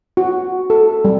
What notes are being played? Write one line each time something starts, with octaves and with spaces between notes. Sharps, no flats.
F#4
A4
G3